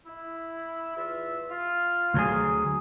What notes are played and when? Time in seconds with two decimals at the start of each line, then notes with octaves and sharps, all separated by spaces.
0.06 E4
0.95 E2 F4 E5
1.50 F4
2.14 D2 F#3 G#4